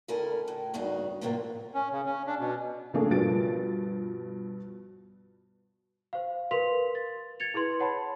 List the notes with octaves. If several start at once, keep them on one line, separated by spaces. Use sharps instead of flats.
D2 C#3 E4 A4 A#4 G#5
A2
E2 G2 C#3 D#4 F#4
A2 C3 F3 A#3 C4 F4
C#4
C#3
C#4
D4
B2
C#3 A3 A#3 D4 G#4 A4
G2 B2 F3 A6 D7
C5 F5
A#4 B4 F5 C6 B6 F7
A6
G#6 A6 C#7 F7
E4 G#4 B4 C6
C#5 F#5 A5 B5